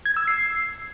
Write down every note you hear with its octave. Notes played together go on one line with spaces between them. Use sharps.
G#6
E6
C7